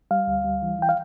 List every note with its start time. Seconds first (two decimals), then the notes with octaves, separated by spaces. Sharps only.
0.11 G3 F5
0.27 D2
0.45 G3
0.62 E3
0.79 E3 G5
0.89 F5